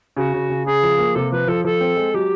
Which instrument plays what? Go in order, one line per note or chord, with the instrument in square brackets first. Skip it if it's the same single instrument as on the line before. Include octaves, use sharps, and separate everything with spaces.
[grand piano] C#3 [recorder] F#4
[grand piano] C#3
C#3
[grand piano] C#3 [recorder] G#4
[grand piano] F3
A#3
[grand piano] C3 [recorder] A4
[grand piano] F3 [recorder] B4
[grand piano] F3 [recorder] A4
[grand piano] F3 [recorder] A4
[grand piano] C4
G#3
[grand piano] F#3 [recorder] G4